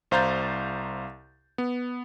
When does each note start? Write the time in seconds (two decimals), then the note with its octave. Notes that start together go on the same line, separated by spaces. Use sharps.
0.11 C2 C5 F5 A#5 G6 A6
1.58 B3